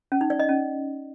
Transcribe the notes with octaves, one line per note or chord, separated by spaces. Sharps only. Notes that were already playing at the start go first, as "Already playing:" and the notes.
C#4
D#4
D5
D#5
C#4